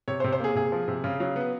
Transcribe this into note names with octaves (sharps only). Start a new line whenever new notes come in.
C3 C#5
C5
C3
C5
A#3 G#4
C3 G#4
F3
C3
C#3
F#3
B3